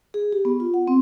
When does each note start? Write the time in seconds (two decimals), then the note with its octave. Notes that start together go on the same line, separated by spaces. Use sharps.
0.14 G#4
0.32 G4
0.45 B3
0.60 F4
0.74 F#5
0.87 C4